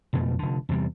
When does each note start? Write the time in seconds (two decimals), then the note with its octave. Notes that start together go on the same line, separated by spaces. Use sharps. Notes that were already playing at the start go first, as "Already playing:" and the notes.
0.13 F#1 F2 B2 A3
0.39 F1 D3
0.69 E2 C3 G3